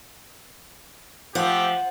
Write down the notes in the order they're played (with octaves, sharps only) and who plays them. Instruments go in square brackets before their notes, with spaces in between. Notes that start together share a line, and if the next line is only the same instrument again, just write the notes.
[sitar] F3 [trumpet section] A3 F4 G4 [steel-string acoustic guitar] F#5